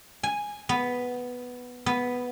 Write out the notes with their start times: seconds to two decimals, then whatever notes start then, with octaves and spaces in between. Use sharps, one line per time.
0.23 G#5
0.69 B3
1.86 B3